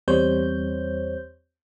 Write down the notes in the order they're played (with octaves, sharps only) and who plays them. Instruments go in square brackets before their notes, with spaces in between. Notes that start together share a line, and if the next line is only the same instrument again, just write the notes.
[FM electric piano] E2 G3 C4 C5 C#5 G6